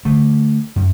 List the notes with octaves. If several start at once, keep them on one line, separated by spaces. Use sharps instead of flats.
D3 A3
F#2